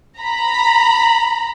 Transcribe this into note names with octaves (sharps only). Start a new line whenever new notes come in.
A#5 B5